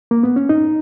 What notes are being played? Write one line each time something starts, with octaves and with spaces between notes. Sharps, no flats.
A#3
B3
C#4
D#4